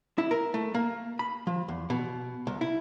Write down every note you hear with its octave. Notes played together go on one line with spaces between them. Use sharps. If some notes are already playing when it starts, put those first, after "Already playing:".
E4
A#4
A3
A#3
B5
F3
E2
B2
C2
E4